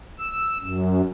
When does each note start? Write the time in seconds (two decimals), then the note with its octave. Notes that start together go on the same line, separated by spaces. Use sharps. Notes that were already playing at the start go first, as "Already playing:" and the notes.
0.19 E6
0.60 F#2